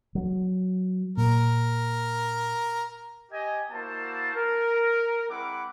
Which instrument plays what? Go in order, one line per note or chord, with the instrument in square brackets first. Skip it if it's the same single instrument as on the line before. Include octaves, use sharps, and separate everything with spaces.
[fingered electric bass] F#3
[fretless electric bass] A#2 [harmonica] A#4
[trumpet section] G4 D#5 G#5
A#3 E4 F#4 C5 A5
A#4
G#3 C4 E4 F#5 B5 D6